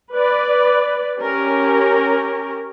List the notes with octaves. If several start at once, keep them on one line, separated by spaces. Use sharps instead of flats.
B4 D5
C#4 G4 A#4